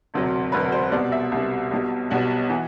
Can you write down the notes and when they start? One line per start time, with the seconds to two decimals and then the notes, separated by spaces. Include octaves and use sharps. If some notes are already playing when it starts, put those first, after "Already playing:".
0.14 E1 D2 C3 F#3
0.52 E1 D2 C3 F#3 B4
0.72 C5
0.92 C2 B2 G3 D5
1.12 E5
1.32 C2 B2 G3
1.71 B1 B2 G3
2.10 B1 B2 G3 F#5
2.50 E3